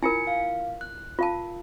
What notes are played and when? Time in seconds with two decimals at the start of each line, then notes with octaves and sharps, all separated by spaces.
0.03 E4 F4 A#4 G#5 C#7
0.27 F5
0.81 F#6
1.19 F4 A#4 F5 A5